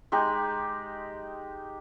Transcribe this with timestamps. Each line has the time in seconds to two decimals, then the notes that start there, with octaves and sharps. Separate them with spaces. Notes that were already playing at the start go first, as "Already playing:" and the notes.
0.12 G#3 D#4 G4 G#4